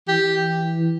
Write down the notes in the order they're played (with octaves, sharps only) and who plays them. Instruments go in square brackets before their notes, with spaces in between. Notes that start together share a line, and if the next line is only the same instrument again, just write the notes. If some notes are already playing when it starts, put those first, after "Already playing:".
[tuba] E3 [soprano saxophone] G4